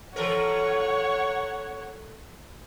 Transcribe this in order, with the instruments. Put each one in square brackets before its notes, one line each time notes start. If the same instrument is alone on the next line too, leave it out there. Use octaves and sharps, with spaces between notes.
[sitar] E3 A4 A#4 [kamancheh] C#5 F#5